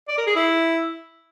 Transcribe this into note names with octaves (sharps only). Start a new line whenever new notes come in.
D5
A#4
G#4
E4